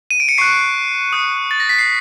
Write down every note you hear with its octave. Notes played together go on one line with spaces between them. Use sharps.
D#7
D7
C#7
C#6 F#6 C7
D#6 F#6
A6
A#6
B6
C7